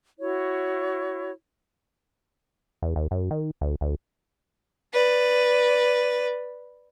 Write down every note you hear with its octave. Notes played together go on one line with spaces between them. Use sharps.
E4 F#4 C#5
E2
D#2
F#2
D#3
D2
D2
B4 D5